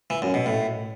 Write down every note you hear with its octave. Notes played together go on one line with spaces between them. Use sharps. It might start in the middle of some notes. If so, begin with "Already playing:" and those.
E3
F#2
B2
A2